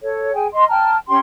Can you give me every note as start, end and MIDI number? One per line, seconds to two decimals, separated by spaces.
0.01 0.31 69
0.01 0.31 73
0.33 0.46 68
0.33 0.46 79
0.33 0.46 80
0.51 0.64 75
0.51 0.64 84
0.69 0.95 79
0.69 0.95 81
0.69 0.95 82
0.69 0.95 89
1.08 1.18 61
1.08 1.18 67
1.08 1.18 79
1.08 1.18 84